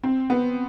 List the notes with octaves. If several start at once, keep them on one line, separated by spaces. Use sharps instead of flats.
C4
B3